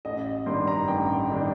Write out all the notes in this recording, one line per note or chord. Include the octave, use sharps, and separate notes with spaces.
A1 D#5
G2 D#3 G3 D4 C6
A#5
A1 G5
D#3 G3 D4